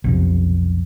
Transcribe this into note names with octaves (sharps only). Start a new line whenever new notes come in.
B1 F2 C3